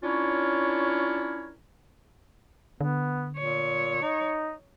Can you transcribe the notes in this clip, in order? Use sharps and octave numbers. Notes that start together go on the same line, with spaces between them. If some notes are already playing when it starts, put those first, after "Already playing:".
C#4 D4 E4 F4 A#4 C#5
D3 B3
A#2 C#5
D#4